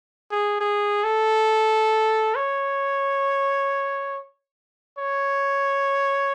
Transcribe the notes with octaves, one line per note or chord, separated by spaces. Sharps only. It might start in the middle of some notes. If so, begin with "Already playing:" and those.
G#4
G#4
A4
C#5
C#5